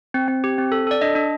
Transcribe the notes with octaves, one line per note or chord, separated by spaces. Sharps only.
C4
C4
G4
C4
A4
A4 D5
D4 D#5
D4